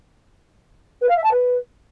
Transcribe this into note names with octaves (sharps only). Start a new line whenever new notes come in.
B4
F5
E5
A5
B4